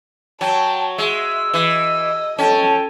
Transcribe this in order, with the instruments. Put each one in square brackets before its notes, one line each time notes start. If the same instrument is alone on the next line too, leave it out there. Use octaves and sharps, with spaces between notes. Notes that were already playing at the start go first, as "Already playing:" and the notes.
[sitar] F#3 [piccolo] G5 [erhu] A5
[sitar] G#3 [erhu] E5 [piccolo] E6
[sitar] E3 [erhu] D#5
[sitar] C#4 [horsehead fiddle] A4 A5 [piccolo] G5